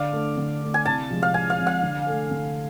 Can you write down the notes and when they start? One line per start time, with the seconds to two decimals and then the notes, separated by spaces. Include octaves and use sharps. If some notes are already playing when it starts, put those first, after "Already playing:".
Already playing: D3 D5 F5
0.12 A3 D4
0.37 D3
0.61 A3 D4
0.74 G#5
0.85 C2 A5
1.10 C3 F3 G#3
1.22 F5
1.34 C2 G#5
1.50 F5
1.58 C3 F3 G#3
1.67 F5
1.83 D3
2.07 A3 D4 A4
2.31 D3